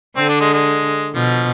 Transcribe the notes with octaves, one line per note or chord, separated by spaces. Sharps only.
D3 C4
D4
G#3
G#3
B2 F3